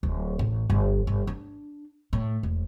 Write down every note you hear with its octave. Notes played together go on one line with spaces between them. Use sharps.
D1
A1
G1
G1
D4
A2
E1